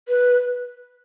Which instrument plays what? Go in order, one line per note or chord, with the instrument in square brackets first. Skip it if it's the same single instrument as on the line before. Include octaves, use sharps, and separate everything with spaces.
[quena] B4